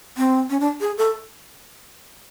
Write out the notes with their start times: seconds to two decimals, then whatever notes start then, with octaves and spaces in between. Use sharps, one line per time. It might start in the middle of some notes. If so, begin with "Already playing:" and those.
0.17 C4
0.50 C#4
0.60 D4
0.81 G#4
0.98 A4